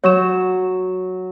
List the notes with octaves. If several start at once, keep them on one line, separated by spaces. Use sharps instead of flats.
F#3 C#5 C#6 E7